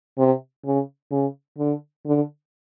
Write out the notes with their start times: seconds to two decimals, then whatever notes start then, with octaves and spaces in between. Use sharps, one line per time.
0.18 C3
0.65 C#3
1.11 C#3
1.58 D3
2.06 D3